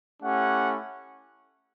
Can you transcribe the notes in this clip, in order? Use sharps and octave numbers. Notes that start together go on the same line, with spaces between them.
A3 C#4 E4 G4 F#5